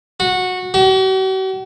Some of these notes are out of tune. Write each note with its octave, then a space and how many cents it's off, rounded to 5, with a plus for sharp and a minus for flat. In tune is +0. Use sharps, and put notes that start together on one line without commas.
F#4 -15
F#4 +45